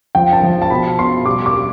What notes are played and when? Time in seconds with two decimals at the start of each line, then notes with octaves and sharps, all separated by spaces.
0.15 F3 G5
0.33 A5
0.43 F3
0.62 A5
0.70 B2 B5
0.99 B2 C6
1.26 G3 D6
1.46 D6
1.54 G3